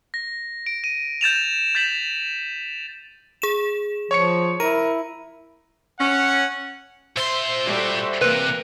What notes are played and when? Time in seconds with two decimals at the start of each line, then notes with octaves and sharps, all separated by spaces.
0.14 A#6
0.66 D7
0.84 D#7
1.21 G6 A6 E7 F7
1.75 G6 A6 B6 E7 F#7
3.42 G#4 E7
4.11 F3 C#5 C#6 C#7
4.60 E4 A#4 D#7
6.00 C#4 F#5
7.17 A#2 C5 E5 C6
7.65 G3 F#4 A4
8.21 C3 E3 A#3 A#4 B4